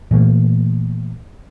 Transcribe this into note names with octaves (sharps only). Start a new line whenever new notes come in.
A#2 E3 A3 A#3